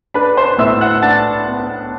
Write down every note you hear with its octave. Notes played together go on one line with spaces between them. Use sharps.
D4 B4 B5
C5 C6
A2 E5 E6
F#5 F#6
D4 A5 A6
B3